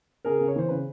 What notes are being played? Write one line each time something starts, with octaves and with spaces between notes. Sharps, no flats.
C#3 G#4 A#4
C#3
C#5
E3 C5
C#3 B4